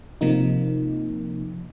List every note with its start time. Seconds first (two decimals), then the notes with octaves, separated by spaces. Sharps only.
0.21 C3 F3 A#3 D#4